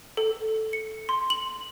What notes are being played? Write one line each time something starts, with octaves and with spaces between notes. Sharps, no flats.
A4
C#7
C6
F#7